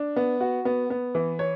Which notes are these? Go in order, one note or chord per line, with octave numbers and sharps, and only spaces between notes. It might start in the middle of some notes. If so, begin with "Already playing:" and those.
Already playing: D4
B3
F#4
B3
B3
E3
C#5